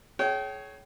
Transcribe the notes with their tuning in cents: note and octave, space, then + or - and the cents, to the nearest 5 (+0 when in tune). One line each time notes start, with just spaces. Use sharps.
G#4 +35 C#5 +0 G5 -30